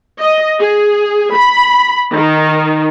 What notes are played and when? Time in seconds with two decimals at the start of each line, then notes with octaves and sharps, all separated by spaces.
0.20 D#5
0.60 G#4
1.35 B5
2.13 D#3